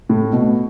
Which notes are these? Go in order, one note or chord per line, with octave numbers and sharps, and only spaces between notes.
A2
B2